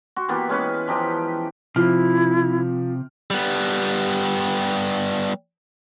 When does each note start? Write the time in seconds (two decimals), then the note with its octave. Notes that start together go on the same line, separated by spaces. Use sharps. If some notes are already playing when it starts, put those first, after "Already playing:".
0.16 F#4 C6
0.29 E3 A#3 B3 G4
0.49 G#3 C#4 B4
0.87 E3 F3 D#4 G4
1.76 C3 F3 E4 F6
3.31 G3 B3